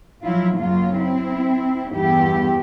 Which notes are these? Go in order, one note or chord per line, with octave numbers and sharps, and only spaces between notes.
F3 F#3 E4 F4
F#2 C#3 F#3 A#3 F4
C4 E4
E2 G2 B3 E4 G4